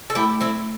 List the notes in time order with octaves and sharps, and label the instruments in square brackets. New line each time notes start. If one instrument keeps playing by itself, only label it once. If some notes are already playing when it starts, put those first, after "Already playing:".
[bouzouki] A4
[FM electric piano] A3 [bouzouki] E4 G4
[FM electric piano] A3 [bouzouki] C4 E4